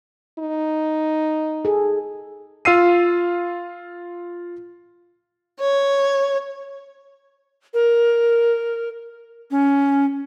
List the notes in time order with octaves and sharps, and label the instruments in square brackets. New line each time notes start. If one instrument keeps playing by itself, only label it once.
[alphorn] D#4
[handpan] G#4 A4
[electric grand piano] F4 F5 E6 C7 D#7
[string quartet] C#5
[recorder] A#4
C#4